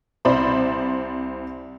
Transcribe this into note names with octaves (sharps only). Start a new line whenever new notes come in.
C2 C5 D5 B5